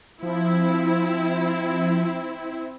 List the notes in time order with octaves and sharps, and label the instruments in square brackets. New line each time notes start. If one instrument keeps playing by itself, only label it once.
[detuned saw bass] F3 [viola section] C4 E4